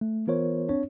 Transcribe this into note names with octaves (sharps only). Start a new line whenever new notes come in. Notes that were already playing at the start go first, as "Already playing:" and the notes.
A3
E3 B3 F4 A#4 C5 C#5
C4 D4 C#5